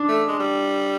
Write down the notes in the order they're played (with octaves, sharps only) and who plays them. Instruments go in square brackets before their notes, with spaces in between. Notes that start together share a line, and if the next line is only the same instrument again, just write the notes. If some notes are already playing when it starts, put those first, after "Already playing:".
Already playing: [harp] D4
[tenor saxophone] A3
G#3
G3